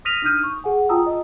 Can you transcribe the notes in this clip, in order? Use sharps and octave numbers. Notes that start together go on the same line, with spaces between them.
D#6 F6 A#6 B6 D#7 F7
D4 D#4 D#6 F6 G6 D#7
C#6
G#4 F#5 G#5
F4 G5 A5 A#5 D#6 E6
D#5